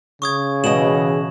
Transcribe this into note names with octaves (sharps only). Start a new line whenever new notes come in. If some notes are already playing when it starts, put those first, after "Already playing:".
C#3 C#6 D#6 G#6
B2 E3 F#4 D#5 E7 F#7